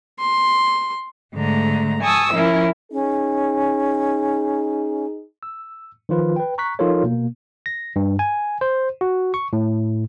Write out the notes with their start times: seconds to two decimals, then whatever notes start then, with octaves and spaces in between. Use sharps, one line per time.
0.20 C6
1.35 G#2 D3 A3 A#5
2.03 G#5 A5 C#6 D#6 E6
2.34 F3 C#4 E4 A#4
2.92 C#4 D#4 G#4
5.43 E6
6.09 D#3 F3 F4 B4
6.36 B4 G5
6.58 A#5 C#6 F#6 B6
6.79 F3 D#4 F4 A4 A#4 C#5
7.03 B2 A#3
7.66 A#6
7.96 G2
8.19 G#5
8.61 C5
9.01 F#4
9.34 C#6
9.53 A2